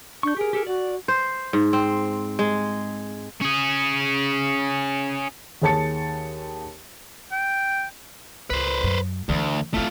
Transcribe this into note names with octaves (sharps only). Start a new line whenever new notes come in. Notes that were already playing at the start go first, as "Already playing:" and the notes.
D4 C#6 G6
G4 G#4 A#4
G4 A4 A#4
F#4 D5
C5
G#2
C4
G#3
C#4 G#4
D#2 G#4 C#5 A5 A6 C#7
G5
C#2 B4 C5
F#2
D2 E3 A3
A3 C4 E4 F4